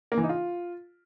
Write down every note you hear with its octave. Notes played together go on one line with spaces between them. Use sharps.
A#3
E3
D#4
F4